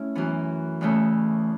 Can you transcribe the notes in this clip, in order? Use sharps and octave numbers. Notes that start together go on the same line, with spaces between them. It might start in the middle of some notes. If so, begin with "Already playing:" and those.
Already playing: A3 C#4 E4
F#2 E3 B3
E2 C#3 A3